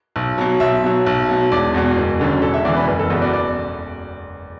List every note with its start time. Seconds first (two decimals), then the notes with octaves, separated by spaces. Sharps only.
0.16 B1
0.38 B2 F#3
0.60 B1 E5
0.84 B2 F#3
1.07 B1
1.29 B2 F#3
1.52 E1 D5
1.74 E2 B2
1.97 F#1
2.19 F#2 D3 F#3
2.42 E1 A4
2.54 E5
2.65 E2 D5
2.68 E3
2.77 B4
2.88 F#1 B4
2.99 A4
3.10 E2 B2 B4
3.22 D5
3.33 D5